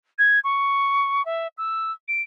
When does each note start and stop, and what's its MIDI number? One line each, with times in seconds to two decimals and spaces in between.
0.18 0.39 92
0.44 1.24 85
1.25 1.47 76
1.58 1.92 88
2.08 2.22 98